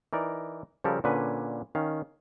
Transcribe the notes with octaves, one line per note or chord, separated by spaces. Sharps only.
E3 D#4 A#4 D5
C#3 F3 G3 G4 A4 A#4
A#2 D3 C#4 B4 G#5
D#3 C#4 F5